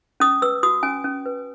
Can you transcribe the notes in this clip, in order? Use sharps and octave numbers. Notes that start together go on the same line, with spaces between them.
C#4 D#6
B4 E6
F#4 D#6
C#4 G#5
C#4
B4